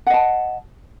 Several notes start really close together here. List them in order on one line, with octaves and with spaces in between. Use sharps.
F#5 D#5 A5